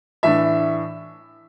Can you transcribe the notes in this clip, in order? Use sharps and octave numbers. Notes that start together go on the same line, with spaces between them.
A2 E3 D4 E5